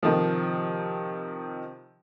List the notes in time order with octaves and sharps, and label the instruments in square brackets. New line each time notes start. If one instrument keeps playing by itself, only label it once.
[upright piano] C3 D#3 F3